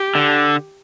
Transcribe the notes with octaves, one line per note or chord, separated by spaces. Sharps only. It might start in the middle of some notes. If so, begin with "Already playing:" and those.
Already playing: G4
D3